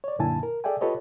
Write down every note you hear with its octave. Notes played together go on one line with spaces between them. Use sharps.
C#5 D5
F#2 A#2 D3 E4 G#5 A5
A#4
G#4 A4 D5 E5 G5 G#5
F4 G4 A4 B4 C#5 D#5